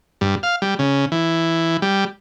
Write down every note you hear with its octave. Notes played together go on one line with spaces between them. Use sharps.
G2
F5
G3
C#3
E3
G3